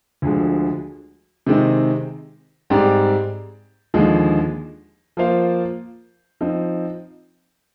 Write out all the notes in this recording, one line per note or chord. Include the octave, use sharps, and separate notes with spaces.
D2 D3 F3 G#3
C3 D#3 G#3 C4 D#4
G#2 G3 C4 G4 D5
D#2 D3 F3 G#3 D#4
F3 A#3 F4 C5 F5
F3 C4 D#4